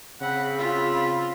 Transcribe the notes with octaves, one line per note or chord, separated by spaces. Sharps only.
C#3 C4 F#5 B5
F4 E6